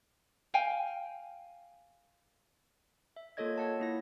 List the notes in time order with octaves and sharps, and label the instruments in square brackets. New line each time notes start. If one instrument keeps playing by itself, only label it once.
[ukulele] F5 G5 G#5
[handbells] E5
A#3 F4 A4 C#5 D#5 G#6
C#5 F#5 A5 G#6
A#3 E4 A#6